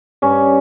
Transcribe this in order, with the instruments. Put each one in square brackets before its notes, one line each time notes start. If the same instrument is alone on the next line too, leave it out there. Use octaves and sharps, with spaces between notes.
[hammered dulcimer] G2 C#4